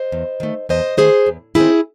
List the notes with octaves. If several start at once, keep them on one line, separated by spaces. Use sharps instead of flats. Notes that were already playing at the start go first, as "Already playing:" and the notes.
Already playing: C5 D#5
E2
D#3 A3
E2 C5 D#5
D#3 A3 G#4 C5
E2
D#3 G#3 C4 E4 G#4